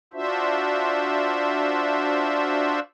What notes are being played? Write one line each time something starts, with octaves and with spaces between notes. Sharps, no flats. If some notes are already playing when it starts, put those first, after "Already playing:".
D4 F4 F#4 C5 E5